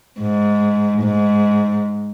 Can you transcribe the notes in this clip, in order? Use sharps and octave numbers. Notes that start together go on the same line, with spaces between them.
G#2
G#2